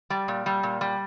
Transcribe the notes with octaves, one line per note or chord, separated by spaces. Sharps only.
G3
A#2
G3
A#2
G3